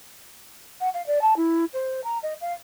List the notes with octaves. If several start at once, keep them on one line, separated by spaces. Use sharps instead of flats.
F#5
F5
D5
A5
E4
C5
A#5
D#5
F5